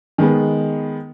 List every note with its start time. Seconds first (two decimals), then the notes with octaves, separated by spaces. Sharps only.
0.18 D#3 G#3 B3